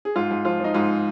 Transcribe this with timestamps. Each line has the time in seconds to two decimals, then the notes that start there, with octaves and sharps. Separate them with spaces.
0.05 G#4
0.16 G#2 F4
0.31 G#2
0.45 F3 F4
0.60 F3 D#4
0.74 G#2 F4